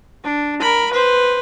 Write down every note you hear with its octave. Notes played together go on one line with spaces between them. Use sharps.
D4
A#4 B5
B4 C5